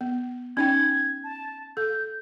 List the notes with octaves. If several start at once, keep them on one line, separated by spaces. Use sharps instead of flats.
B3
C#4 D#4 G5 G#6
A5
A4 G6